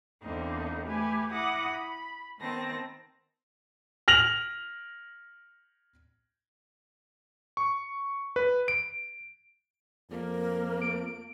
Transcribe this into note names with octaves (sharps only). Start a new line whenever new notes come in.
E2 D3 A#3 C4 D#4
A3 G4 B4 G#5
E4 F#5 D6 D#6 A#6
B5
D#3 B3 C4 A5 A#6
F6 A#6 F7 F#7
C#6
B4
D7
F2 A#3 A#4
D7